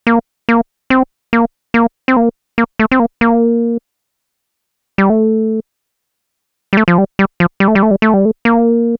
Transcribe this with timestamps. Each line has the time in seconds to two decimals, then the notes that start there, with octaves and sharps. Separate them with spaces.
0.07 A#3
0.49 A#3
0.90 C4
1.33 A#3
1.74 A#3
2.08 C4
2.17 A#3
2.58 A#3
2.79 A3
2.92 C4
3.00 A#3
3.21 A#3
4.98 G3
5.10 A3
6.73 G3
6.77 A3
6.88 F3
6.98 G3
7.19 G3
7.40 F3
7.60 G3
7.68 A3
7.75 G3
7.83 A3
7.91 G3
8.02 A3
8.14 G3
8.25 A3
8.45 A#3